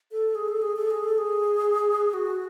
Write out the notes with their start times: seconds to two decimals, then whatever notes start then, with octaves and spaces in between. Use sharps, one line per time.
0.11 A4
0.35 G#4
0.48 A4
0.62 G#4
0.76 A4
0.90 G#4
1.04 A4
1.18 G#4
2.13 F#4